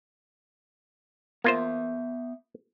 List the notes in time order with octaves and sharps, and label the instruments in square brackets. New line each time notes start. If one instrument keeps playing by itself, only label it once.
[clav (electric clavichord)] A#3 F4 C5 [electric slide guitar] B3 E5